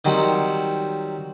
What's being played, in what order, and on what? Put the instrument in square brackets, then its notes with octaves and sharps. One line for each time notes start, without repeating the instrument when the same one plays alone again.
[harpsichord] D#3 F#3 G3 C4